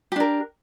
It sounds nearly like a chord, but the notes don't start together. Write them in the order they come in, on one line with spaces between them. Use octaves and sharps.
G4 D4 A#4